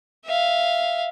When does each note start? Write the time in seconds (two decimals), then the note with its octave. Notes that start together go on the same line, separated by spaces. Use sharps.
0.25 E5 F5